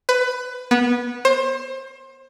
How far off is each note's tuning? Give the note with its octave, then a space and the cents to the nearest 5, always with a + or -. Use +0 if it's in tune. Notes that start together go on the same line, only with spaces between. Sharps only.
B4 +20
B3 -20
C5 +30